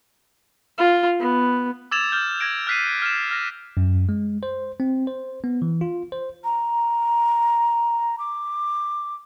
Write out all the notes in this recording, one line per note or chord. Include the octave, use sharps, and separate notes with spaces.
F4
B3
D6 E6 G#6 A6 E7 F7
F6 G6
G#6 A#6 D7
F6 F#6 B6 C7 D#7
F6 A6 E7
F6 A#6
F#2
G#3
C5
C4
C5
B3
E3
F4
C5
A#5
D6